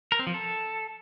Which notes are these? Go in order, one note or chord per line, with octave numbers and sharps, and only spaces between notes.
A#4
C4
F3
A4